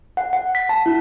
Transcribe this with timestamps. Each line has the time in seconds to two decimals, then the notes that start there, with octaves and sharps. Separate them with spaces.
0.17 F#5
0.33 F#5
0.55 B6
0.69 A5
0.86 E4